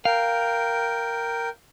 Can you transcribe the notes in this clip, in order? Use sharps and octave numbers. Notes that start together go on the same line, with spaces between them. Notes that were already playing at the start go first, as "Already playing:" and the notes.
A#4 F5 G5